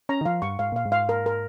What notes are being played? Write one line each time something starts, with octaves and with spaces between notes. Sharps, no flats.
C#4 A#5
D#3
F3 F5
G2 C#6
G#2 F5
A#2 F5
G#2
F5
A#4
A#4